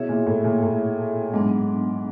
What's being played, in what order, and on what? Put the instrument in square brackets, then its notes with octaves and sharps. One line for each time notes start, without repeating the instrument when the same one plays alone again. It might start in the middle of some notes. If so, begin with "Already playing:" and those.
Already playing: [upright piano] B2 [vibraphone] E4 G#4 C#5 E5
[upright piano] A#2
A2
A#2
A2
[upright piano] G#2 [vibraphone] F#3 B3 D4